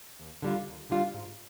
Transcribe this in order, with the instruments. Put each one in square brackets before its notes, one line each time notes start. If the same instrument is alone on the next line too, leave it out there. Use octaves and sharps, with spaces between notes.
[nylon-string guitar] D#2
D3 G3 D4 F4
D#2
D3 G3 D4 F4
G#2